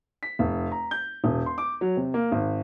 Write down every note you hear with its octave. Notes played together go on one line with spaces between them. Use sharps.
B6
F1
A#5
G6
E1
C6
D6
F#3
C3
A#3
G#1